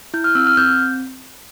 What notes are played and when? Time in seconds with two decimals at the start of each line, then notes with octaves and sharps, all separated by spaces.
0.14 E4 G6
0.24 F6
0.35 C4 E6
0.47 F6
0.57 C4 G6